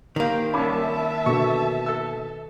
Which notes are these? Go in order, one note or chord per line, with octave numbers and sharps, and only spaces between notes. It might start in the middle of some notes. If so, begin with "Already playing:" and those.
D#3 A#3 G4 C5
C2 C#4 E5 A5 B5 D6
B2 D3 C#6
A4 E6